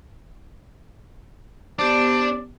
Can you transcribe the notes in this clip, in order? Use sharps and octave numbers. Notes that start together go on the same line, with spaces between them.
B3 D4 G4 C5 D5